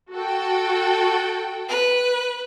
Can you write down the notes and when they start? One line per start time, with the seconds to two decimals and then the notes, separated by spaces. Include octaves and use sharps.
0.13 F#4 A4 G5
1.69 B4